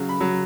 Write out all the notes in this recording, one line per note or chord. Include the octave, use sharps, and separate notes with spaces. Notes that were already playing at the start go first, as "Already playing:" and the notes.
Already playing: C#3 F#3
B5
C#3 F#3